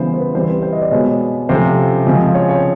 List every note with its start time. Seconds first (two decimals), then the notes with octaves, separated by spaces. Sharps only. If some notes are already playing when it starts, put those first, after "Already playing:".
Already playing: C#3 E3 G3 B3 C5
0.14 C5
0.20 B4
0.35 E3 G3 C4 C5
0.49 B4
0.62 C5
0.73 D#5
0.82 D5
0.91 B2 G#3 B3 C#5
1.49 C3 F3 A3 C#4 C5
2.06 C#3 F3 G#3 C4
2.35 C#5
2.49 C#5